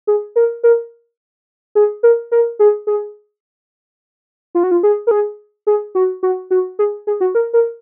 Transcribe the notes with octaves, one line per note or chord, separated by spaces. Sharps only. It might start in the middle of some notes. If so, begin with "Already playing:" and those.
G#4
A#4
A#4
G#4
A#4
A#4
G#4
G#4
F4
F#4
F4
G#4
A#4
G#4
G#4
F#4
F#4
F#4
G#4
G#4
F#4
A#4
A#4